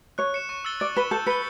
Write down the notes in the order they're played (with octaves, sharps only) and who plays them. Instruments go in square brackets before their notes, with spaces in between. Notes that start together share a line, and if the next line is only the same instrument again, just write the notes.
[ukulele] C#5 [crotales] F#6
[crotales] C#7 E7
C#6
E6 A6 C#7 G7
[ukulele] D5 [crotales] A6
[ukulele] B4 [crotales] E7 G7
[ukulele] A4 [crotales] G6
[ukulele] B4 [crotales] C#7 G7